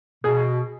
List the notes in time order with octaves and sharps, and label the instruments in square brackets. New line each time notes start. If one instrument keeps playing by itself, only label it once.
[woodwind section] B2 [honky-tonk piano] G#4